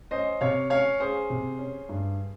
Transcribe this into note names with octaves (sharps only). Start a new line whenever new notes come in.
C#4 C5 D#5
C3 C#5 F5
C#4 C#5 F5
C#4 G#4 C5
C3
C#4
G2